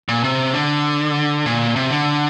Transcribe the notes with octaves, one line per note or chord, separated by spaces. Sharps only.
A#2
C3
D3
A#2
C3
D3